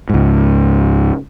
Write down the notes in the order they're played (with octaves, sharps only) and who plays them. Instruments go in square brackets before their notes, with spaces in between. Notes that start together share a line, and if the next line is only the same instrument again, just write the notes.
[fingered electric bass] C#2 G#2